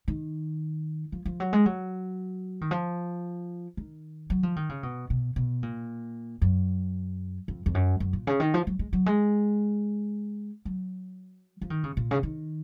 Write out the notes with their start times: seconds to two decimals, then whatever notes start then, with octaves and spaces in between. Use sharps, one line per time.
0.08 D#3
1.12 F3
1.25 F3
1.40 F#3
1.53 G#3
1.66 F#3
2.61 D#3
2.71 F3
3.77 D#3
4.30 F#3
4.43 F3
4.56 D#3
4.69 C#3
4.83 B2
5.10 B2
5.36 B2
5.63 A#2
6.42 F#2
7.48 F2
7.66 F2
7.75 F#2
8.00 F#2
8.13 A#2
8.27 C#3
8.40 D#3
8.54 F3
8.67 F#3
8.79 G#3
8.93 F#3
9.06 G#3
10.65 F#3
11.61 F3
11.70 D#3
11.84 C#3
11.97 A#2
12.11 C#3
12.23 D#3